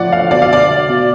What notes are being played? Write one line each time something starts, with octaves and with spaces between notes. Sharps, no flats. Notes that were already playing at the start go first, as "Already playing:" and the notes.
Already playing: A2 F3 D5 F#5
F5
B2 D5
F5
D5
B2